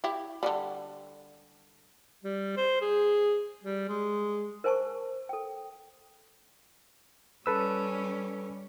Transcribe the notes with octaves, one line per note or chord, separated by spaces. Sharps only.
E4 G4
D3 F#3 G3
G3
C5
G#4
G3
G#3
A#4 C5 G#5 A5 C#6
A4 G5
G3 C#4 A4 B4 E6